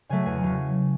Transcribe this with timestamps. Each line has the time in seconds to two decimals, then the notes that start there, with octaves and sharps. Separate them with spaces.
0.09 C#3 F#3 A3 G#5
0.26 E2 G#5
0.43 C#3 F#3